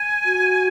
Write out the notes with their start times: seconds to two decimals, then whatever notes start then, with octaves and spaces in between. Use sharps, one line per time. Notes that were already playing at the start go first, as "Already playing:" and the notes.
Already playing: G#5
0.25 F#4